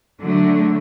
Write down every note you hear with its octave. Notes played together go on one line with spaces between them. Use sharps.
D3 F#3 A3